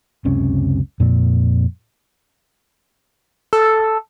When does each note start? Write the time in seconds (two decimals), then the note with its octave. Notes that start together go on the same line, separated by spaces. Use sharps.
0.25 F#1 C#2 C3 C#4
1.00 F2 A#2
3.53 A4